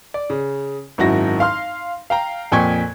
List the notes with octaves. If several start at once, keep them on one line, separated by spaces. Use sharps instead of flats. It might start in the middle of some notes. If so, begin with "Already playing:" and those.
D5
C#3
G#1 F#2 E4 F#4 A#6
F5 C6 F6
F5 G5 A#5
F2 A#2 G5 G#5 C#6 G#6